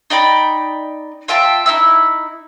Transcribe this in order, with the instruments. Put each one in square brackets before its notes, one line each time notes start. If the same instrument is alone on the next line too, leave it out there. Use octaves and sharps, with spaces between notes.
[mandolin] D#4 D5 G5 B5
F4 E5 G5 A5
D#4 E4 E6